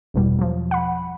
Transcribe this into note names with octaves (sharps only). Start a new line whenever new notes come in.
G1 E2 B2 G3
F3 F#3
F#5 B5